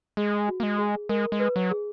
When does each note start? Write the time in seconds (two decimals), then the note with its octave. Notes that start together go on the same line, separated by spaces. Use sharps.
0.17 G#3 G#4
0.48 F#4
0.60 A#3
0.63 G#3
0.79 G#4
1.09 G#3 A#4
1.32 G#3
1.40 B4
1.56 F#3
1.71 G#4